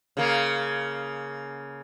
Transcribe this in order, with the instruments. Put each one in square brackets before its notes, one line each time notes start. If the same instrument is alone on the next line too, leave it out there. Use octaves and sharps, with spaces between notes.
[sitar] C#3 A#3